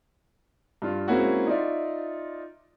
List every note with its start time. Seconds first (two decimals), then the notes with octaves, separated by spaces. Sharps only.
0.82 G2 F4
1.08 G#3 A#3 C4 C#4 E4 F#4
1.47 D#4 F4 D5 E5